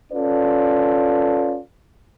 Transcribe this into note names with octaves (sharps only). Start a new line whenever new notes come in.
C#4 F4 A4 B4 D5